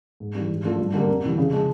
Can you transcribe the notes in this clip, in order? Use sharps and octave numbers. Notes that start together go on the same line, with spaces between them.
G#2
E3 G3
G#2
F3 A3 D4 F4
G2
D3 G3 A#3
F2
C3 E3 G3
C#3
F3 G#3